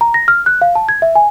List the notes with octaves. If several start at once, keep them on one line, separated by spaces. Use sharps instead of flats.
A#5
A#6
F6
F#6
F5
A5
G#6
E5
G#5